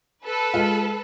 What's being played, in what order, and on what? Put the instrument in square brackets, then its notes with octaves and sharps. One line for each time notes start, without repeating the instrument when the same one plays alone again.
[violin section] A4 B4
[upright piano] G#3 F4